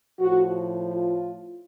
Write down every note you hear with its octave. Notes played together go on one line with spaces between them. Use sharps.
A2 F3 F#4
F4